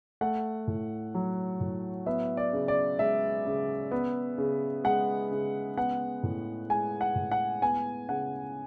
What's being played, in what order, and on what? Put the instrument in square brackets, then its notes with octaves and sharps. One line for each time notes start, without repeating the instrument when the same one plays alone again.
[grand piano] A3 F#5
A2
F#3
A2
B3 E5
D5
C#3
D5
G#3 E5
C#3
B3
C#3
G#3 F#5
C#3
B3 F#5
A2
G#3 G#5
F#5
A2
F#5
B3 G#5
C#3 F#5